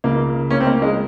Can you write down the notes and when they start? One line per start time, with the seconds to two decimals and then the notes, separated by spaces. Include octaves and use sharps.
0.04 C#2 C#3 A#3
0.50 A#3 C#4
0.60 C4
0.67 A#3
0.82 G#3